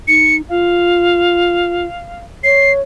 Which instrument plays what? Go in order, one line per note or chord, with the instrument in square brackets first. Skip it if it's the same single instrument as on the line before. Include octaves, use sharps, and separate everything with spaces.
[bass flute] D#4 [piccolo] C#7
[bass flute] F4 [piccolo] F5
[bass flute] C#5 [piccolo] C7